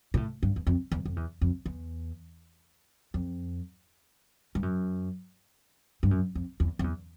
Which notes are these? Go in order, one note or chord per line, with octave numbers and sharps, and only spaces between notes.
A#2
A2
G2
E2
F2
E2
F2
E2
F2
E2
F2
G2
F#2
G2
F#2
F2
E2
F2
E2